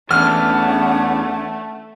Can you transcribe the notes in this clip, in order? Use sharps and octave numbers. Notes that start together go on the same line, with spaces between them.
E2 A3 C#4 D4 F#5 F6